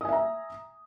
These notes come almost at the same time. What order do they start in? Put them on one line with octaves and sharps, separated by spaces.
D#6 G#5 E5 A#5